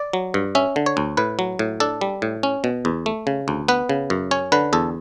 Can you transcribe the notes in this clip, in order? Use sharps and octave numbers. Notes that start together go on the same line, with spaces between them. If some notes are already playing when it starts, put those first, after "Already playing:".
Already playing: D5
F#3
G2
C#4 E5
D3
C#5
D2
A2 B4
F#3
A2
D4 A4
G3
A2
C#4
B2
E2
A3
C#3
D2
B3 B4
C#3
F#2
C#4 C#5
D3 B4
E2 A4